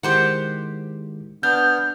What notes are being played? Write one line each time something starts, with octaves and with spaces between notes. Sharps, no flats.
D#3 G#3 E4 G4 C5 F#5
B3 D4 F6 G6